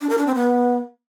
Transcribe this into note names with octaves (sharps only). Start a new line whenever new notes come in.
D4
A#4
D4
C4
B3